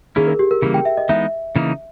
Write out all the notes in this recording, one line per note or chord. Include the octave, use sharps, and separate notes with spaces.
D#3 A#3 C#4 E4 G#4
A#4
G4
A#4
C#3 E3 G3 A#3
G5
E5
D#5
E3 G#3 B3 D#4 E5
C#3 E3 A#3 D#4